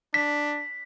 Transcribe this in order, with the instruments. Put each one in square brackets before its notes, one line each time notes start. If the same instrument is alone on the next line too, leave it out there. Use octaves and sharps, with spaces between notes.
[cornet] D4 [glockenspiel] B6